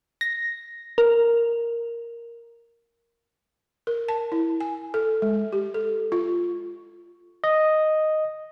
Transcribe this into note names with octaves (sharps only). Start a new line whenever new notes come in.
A#6
A#4
A#4
A5
E4
G#5
A4
G#3
G4
A4
F4
D#5